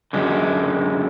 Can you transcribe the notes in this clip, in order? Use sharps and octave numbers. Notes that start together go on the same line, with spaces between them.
F#2 D3 G#3